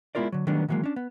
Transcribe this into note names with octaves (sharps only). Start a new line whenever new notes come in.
G#3 B3 E4 F4 A#4 D5
D3 F#3
D#3 F#3 G3 A3 B3 D4
D#3 E3 F#3 G#3 A#3
C#4 D4
B3